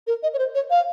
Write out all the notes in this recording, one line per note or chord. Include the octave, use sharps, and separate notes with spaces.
A#4
D#5
C#5
C5
C#5
F5